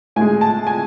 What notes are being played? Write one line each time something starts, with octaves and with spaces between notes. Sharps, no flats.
A2 G#3 G#5
A5
G#5